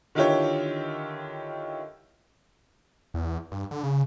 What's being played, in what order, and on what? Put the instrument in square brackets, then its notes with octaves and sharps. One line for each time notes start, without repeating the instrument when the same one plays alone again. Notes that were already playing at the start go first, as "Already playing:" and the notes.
[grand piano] D3 D#3 E4 F4 G4 C#5
[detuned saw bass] E2
G2
D3
C#3